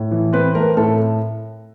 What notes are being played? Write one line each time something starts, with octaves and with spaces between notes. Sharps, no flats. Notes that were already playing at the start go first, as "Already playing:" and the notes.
Already playing: A2
E3
C4 B4
A3 A#4
A2 A4